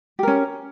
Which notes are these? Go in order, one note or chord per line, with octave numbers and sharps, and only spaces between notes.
C#4 G4 A#4